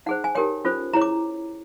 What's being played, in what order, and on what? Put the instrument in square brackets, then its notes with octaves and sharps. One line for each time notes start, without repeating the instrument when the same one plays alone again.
[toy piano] D#4 G#4 C5 F#5
G#5
D#4 G4 A#4 C#5 G5
C#4 F4 A4 C5
E4 G#4 C#5 A#5
D6